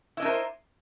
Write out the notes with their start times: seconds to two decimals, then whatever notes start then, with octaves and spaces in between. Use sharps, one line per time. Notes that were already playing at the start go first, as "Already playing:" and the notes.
0.17 E4
0.20 D#5
0.22 D4
0.25 A#4
0.27 C5